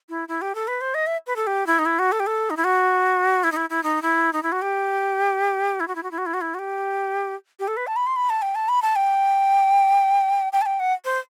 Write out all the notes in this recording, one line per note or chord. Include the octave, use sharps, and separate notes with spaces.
E4
E4
G4
A4
B4
C5
D#5
E5
B4
A4
G4
E4
D#4
E4
F#4
A4
G4
A4
D#4
E4
F#4
E4
D#4
E4
E4
D#4
E4
D#4
E4
F#4
G4
E4
F#4
E4
F#4
E4
F#4
E4
F#4
E4
F#4
G4
G4
A4
B4
A5
B5
C6
B5
A5
G5
A5
B5
A5
G5
G5
A5
G5
F#5
C5